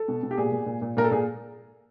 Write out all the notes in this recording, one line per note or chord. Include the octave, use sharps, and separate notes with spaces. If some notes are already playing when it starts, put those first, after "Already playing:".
Already playing: A4
B2
B2
G4
A#2 G#4
A#2
A#2
A#2
A#2 A#4
A4
A#2 G#4